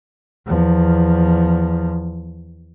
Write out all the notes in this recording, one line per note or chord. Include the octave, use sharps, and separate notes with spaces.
E2 F3